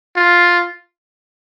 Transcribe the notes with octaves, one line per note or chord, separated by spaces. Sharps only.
F4